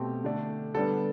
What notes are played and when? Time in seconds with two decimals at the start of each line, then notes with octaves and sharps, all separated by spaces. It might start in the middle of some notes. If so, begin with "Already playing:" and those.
Already playing: B2 A3 C4 G4
0.24 D3 A3 D4
0.74 D3 G3 B3 D4 A4